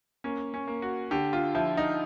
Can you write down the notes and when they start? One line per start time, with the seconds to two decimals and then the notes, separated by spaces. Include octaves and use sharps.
0.24 A#3 C#4
0.54 C#4
0.67 A#3
0.82 F#4
1.11 D3 G4
1.33 F4
1.55 F3 E4
1.77 D#4